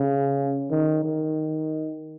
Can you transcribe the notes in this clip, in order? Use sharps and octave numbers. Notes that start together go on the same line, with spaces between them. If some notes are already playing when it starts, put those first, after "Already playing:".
Already playing: C#3
D#3
D#3